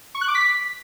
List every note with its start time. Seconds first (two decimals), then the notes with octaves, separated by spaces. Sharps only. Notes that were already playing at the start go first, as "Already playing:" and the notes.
0.15 C#6
0.21 F#6
0.28 D6
0.35 B6